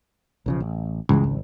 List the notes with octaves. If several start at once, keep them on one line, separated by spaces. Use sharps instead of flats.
B1 C#3 F3
A1
C#2 G2 E3 G#3
G#1